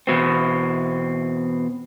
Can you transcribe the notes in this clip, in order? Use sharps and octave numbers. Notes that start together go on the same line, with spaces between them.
E2 B2 C4